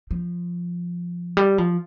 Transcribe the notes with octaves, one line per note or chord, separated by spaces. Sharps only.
F3
G3
F3